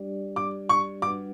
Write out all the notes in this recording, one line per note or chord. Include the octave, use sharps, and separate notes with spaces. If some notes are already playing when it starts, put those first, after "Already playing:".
Already playing: G3 D4 G4 D5
D6
C#6
G3 D4 F#4 B4 F#5 D6